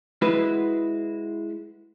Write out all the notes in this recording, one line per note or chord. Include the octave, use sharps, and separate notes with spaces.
G#3 E4 F#4 B4